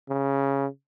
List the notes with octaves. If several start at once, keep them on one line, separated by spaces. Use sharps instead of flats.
C#3